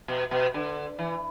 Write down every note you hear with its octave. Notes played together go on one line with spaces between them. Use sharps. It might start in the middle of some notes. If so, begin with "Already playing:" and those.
B2
B2
D3
E3